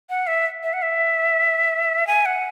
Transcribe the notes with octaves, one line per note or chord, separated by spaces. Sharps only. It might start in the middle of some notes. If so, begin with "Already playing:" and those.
F#5
E5
E5
F#5
E5
G#5
F#5